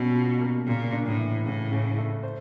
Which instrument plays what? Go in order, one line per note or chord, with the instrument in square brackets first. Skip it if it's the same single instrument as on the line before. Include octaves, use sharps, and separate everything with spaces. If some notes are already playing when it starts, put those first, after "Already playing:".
Already playing: [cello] B2 [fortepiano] G3 A#3 C#4
[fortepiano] F4
A#3
[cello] A#2 [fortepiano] C#3
[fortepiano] D4
[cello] A2
[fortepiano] E3
[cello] A2 [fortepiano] C#3
[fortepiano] C#3
A3
C5